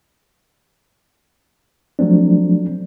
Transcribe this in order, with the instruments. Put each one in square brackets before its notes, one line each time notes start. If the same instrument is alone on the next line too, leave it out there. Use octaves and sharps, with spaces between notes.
[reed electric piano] F3 F#3 A3 C4 D4